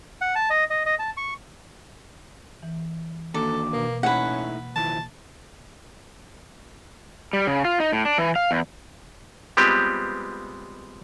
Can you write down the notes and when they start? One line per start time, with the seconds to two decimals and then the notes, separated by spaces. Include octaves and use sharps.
0.21 F#5
0.35 A5
0.50 D#5
0.70 D#5
0.86 D#5
0.99 A5
1.17 C#6
2.63 E3
3.34 D#3 A#3 D4 F#4 A4 D5
3.73 B2 A#3
4.03 A2 C#4 D#4 E4 B4 F#5
4.76 D#3 E4 F4 A5
7.33 G3
7.47 C#3
7.65 F4
7.80 D#4
7.93 A2
8.05 D4
8.18 E3
8.36 F5
8.51 E2
9.57 G3 G#3 B3 C4 F4 G4